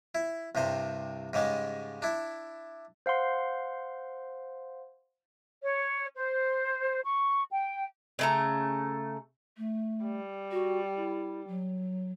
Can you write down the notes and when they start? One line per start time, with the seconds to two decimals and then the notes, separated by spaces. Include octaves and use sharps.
0.15 E4
0.55 C2 G2 C3 C5
1.33 G#2 C#3 G3 G#3
2.02 D4 E4
3.06 C5 F5 F#5 C6
5.63 C#5
6.16 C5
7.04 C#6
7.51 G5
8.19 C#3 A3 A#5
9.58 A3
10.05 G3
10.52 F#4
10.96 E4
11.48 F#3